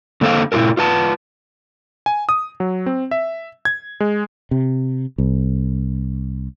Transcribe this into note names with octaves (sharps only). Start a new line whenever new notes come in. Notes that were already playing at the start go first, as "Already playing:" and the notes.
D3 A#3 A4 C5 F5
A#2 E4 F4 A4 A#4
F4 B4 A5
G#5
D#6
F#3
C4
E5
G#6
G#3
C3
C2